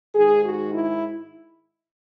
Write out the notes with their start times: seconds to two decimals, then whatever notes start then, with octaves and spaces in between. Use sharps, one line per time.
0.15 G#2 D#3 G#4
0.45 F#4
0.74 E4